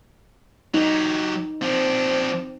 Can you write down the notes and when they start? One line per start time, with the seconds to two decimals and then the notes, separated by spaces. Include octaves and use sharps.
0.74 F#3 D#4 G4
1.62 F3 C4 D4